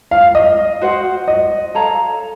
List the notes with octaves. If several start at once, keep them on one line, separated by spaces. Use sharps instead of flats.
F5
D#5
F#4 C5 F#5
D#5
A4 C#5 F5 A#5